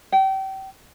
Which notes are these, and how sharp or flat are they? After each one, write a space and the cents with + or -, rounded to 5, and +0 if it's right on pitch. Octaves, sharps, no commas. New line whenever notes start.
G5 -30